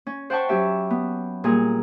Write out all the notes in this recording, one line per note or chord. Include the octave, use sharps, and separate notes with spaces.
C#4
C5 F#5 G5 A5 B5 C#6
F#3 C#4 G4 E5
B3
A#2 G3 G#4 A#4